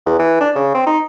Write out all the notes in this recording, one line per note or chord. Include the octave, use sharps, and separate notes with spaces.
E2
E3
D4
C#3
C4
D#4